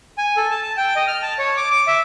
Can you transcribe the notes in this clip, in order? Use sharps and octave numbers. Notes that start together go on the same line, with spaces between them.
G#5
A4
A5
A5
G5
D#5
F6
A5
C#5
D6
D6
E5